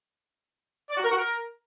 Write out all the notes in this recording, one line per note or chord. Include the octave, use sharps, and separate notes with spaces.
D5
F#4
A#4
F#4
A#4